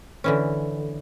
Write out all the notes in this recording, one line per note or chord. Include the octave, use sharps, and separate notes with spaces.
D3 E3 C#4